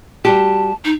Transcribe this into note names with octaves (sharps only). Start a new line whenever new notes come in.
G3 F#4 G4 A5
D#4